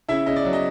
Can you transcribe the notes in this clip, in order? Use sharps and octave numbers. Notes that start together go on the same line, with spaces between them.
C#3 E4 E5
C#3 D#5
D5
F#3
D#5